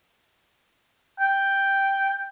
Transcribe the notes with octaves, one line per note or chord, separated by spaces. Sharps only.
G5